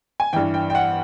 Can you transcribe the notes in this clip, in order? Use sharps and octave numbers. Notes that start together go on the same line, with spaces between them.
G#5
G2 E3 G5
G5
G5
F#5